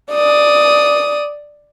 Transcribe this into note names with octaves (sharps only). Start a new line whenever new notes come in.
D5 D#6